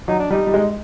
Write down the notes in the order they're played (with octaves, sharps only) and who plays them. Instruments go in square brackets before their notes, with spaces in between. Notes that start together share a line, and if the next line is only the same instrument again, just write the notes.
[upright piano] F#3 [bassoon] D#4
[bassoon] D4
[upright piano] G3 [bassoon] D#4
[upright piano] G3
G#3